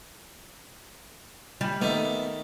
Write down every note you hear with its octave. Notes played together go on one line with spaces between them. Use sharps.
G3
D#3 A3 B3